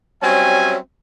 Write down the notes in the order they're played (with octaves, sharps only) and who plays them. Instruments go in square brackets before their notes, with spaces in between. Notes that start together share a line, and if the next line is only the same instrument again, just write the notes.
[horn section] F#3 G3 C4 C#4 E5 G#5